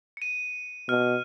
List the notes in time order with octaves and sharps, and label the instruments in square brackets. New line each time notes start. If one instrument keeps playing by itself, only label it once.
[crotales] C#7 D#7
[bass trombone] B2 [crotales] F6